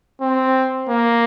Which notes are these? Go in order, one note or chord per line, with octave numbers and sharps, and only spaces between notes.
C4
A#3